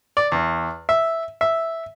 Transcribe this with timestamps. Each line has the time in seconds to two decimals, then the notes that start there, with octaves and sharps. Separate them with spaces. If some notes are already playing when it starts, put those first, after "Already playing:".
0.17 D5
0.32 E2
0.89 E5
1.41 E5